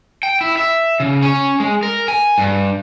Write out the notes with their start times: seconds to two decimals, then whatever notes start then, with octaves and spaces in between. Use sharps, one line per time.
0.23 G5
0.41 E4
0.57 E5
1.00 C#3
1.22 C#4
1.60 G#3
1.83 A#4
2.08 G#5
2.38 G2